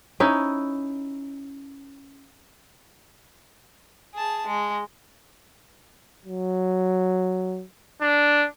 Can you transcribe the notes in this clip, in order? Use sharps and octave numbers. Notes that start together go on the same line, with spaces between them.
C#4 D#4 E4
G#4 A5
G#3
F#3
D4